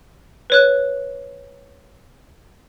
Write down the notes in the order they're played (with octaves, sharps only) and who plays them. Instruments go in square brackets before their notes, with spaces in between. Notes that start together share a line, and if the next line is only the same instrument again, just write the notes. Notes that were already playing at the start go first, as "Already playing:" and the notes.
[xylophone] B4 C#5 F#6